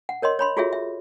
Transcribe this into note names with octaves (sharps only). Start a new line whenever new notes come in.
F#5
A#4 C#5 D#5 C6
C#5 B5 C6
F4 F#4 G#4 A4 C#5 E5
E5